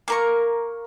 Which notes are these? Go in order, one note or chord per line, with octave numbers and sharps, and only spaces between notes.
A#3 A#4 C#6